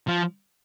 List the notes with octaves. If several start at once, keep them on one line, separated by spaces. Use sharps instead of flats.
F3